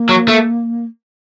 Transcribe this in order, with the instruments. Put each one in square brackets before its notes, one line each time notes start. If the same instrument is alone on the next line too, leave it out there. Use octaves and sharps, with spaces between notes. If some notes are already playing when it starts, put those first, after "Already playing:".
Already playing: [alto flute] A#3
[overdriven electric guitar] F#3
A3